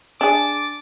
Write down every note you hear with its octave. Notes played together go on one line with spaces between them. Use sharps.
D4 G#4 A5 D6